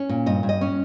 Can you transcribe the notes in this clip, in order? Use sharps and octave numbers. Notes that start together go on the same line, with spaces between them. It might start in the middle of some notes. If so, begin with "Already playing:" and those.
Already playing: C#4
A#2
G2 D#5
G2
D#5
C#4